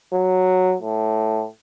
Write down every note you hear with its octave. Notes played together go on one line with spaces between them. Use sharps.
F#3
A2